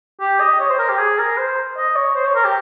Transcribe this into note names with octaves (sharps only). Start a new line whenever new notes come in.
G4
D#5
C#5
C5
A#4
G4
G#4
A#4
C5
D#5
C#5
C5
C#5
A#4
G4